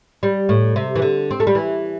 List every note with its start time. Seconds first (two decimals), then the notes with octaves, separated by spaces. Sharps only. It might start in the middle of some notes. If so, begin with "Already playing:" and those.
0.23 G3
0.49 A2
0.76 C3
0.96 E3
1.02 D3
1.31 C4
1.40 A3
1.47 G3
1.55 E3